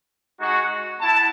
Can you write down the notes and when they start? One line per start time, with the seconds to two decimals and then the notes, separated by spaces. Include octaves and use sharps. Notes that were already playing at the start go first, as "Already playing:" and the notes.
0.39 G#3 D#4 F#4
0.97 B3 E4 A5